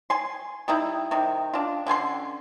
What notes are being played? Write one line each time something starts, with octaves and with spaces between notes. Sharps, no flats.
G#5 C6
G3 D#4 E4
C3 D#3 G3
D4 F4
D3 C#4 G#5 C6